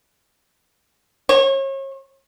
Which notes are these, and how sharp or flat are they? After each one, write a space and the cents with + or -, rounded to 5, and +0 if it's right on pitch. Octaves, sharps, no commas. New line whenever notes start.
C#5 -35